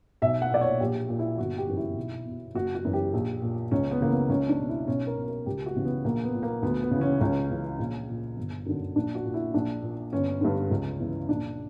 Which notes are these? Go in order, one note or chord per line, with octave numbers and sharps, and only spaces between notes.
B1 E5
F#5
A#2 D5
C#5
A#1 G4
A#2
E4
G1 F#4
G4
F#2 E3
E4
B1
B2
F#1 F#4
F#4
F#2 E3
G4
A#1
A#2
C#2 C#4
B3
C#3 E3 A#3
B3
C#2 C#4
D4
B2
E4
B1 C#4
A#4
B2
A#4
C#2 G4
F#4
C#3 E3
B3
A#1 A#3
B3
A#2
A#3
D2 B3
B3
C#3
E3 C#4
C#2 C#4
C#3 E3
A#1
A#2
G1
F#2 D3
A#1 D4
F#4
A#2
E4
A#1 D4
A#2
G1 C#4
G2 D3
C#2
C#3 E3
A#1 D4